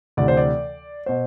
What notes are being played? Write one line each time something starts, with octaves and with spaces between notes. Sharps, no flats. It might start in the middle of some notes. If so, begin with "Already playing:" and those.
D2 C3 E3 D5
C5
D5
B2 C5